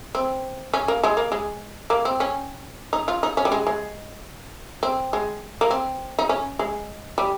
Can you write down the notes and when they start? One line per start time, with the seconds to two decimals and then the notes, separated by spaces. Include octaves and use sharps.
0.15 C4
0.74 C#4
0.88 A#3
1.03 G#3
1.17 A#3
1.32 G#3
1.90 A#3
2.05 C4
2.20 C#4
2.93 D#4
3.08 F4
3.23 D#4
3.37 C#4
3.45 G3
3.52 G#3
3.67 G#3
4.83 C4
5.13 G#3
5.61 A#3
5.71 C4
6.19 D#4
6.29 C#4
6.59 G#3
7.18 G3